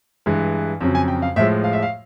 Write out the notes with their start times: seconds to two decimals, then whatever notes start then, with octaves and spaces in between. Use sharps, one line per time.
0.26 G2 E3 G#3
0.80 F2 C#3 F#3
0.95 G#5
1.08 G5
1.22 F5
1.36 A2 F3 G#3 E5
1.64 F5
1.73 E5
1.83 F5